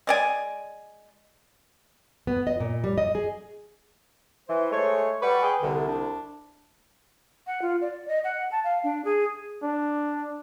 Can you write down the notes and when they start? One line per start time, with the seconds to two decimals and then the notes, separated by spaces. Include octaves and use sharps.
0.07 G#3 D5 G#5
2.27 B3
2.47 D#5
2.60 A#2
2.84 G3
2.98 D#5
3.15 G#4
4.48 E3 C5
4.71 G#3 A3 C#5
5.22 G3 B4 F#5 C#6
5.43 G#4 G5
5.62 C2 D3
5.88 D4
7.47 F#5
7.62 F4
7.81 D5
8.08 D#5
8.24 F#5
8.51 A5
8.64 F5
8.84 D4
9.05 G#4
9.63 D4